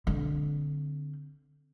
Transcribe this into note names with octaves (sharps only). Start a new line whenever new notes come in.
D3 C4